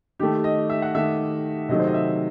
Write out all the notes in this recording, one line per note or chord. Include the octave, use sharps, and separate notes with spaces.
D#3 A3 G4
D#5
E5
F#5
D#3 A3 E5
C3 D#3 F#3 A3 D#5
C5
D#5
E5